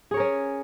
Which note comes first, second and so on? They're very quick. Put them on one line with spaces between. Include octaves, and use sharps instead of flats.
G#4 C#5 A#4 C#4